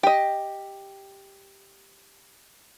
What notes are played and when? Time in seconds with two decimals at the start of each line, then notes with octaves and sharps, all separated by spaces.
0.03 G4 D#5